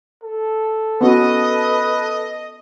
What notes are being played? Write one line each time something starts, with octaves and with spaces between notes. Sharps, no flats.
A4
B3 C#4 F#4 B4 D#5